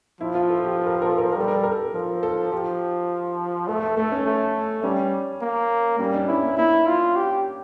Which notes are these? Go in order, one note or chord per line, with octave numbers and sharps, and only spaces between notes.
F3 E4
F4
A4
G4
A4
A#4
A4
A#4
A4
A#4
A4
A#4
G3 A4
A#4
A4
A#4
A4
F3 A#4
A4
F3 G4
A3 A4
A4
A3 A4
C#4
A3
G3 C#4
A#3
G3 C#4
D4
C#4 E4
A#3
A#3 E4
F4
G4